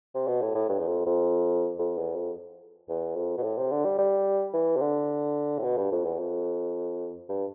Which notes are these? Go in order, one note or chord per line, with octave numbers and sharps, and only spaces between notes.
C3
B2
A2
A2
G2
E2
F2
F2
F2
E2
F2
E2
F2
B2
A2
C3
D3
G3
G3
E3
C3
D3
A2
B2
G2
F2
E2
F2
G2